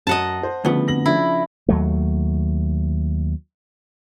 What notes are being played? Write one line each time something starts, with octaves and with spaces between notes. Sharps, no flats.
F#2 D#5 F#5 A5
C5
D2 C#3 F3 B3 G7
F2 A#6 F#7
C#3 F3 D4 E4
D#2 F#3 A3